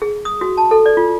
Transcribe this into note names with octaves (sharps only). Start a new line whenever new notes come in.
G#4
D#6
F#4
A5
A4
D5
F4